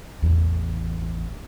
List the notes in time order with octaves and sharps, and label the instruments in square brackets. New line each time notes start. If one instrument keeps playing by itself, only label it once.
[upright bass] A1 E2